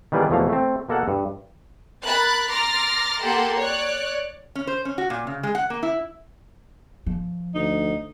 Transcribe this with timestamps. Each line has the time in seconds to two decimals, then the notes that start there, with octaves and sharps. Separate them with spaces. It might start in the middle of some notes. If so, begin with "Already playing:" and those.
0.12 D#3 E3 G3 B3 G#4 D5
0.30 E2 B2 F3 A3 A#3 F5
0.49 A3 C4
0.89 B2 A#3 A4 F#5
1.08 G2
2.05 A#4 B5 F#6 A6
2.50 A#5 C6 D6 F6 A6 A#6
3.22 A#3 G4 A4 F#5 C6
3.59 C#5 D5 F#6
4.55 C#4
4.67 C5
4.85 C#4
4.98 F#4
5.10 A#2
5.27 C#3
5.43 G#3
5.55 F#5
5.70 A#3
5.83 E4
7.06 F3
7.55 D2 D#4